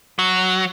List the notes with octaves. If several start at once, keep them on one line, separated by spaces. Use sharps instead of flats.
F#3